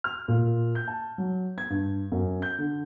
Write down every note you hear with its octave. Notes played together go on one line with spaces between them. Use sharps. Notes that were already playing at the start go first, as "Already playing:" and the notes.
F6
A#2
G6
A5
F#3
G#6
G2
F#2
G6
D3